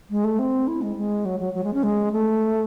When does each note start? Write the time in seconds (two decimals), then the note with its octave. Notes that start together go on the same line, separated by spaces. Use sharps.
0.10 G#3
0.24 A3
0.39 C4
0.68 E4
0.82 G#3
0.97 G#3
1.25 F#3
1.40 F#3
1.54 F#3
1.64 G#3
1.74 C#4
1.83 G#3
2.12 A3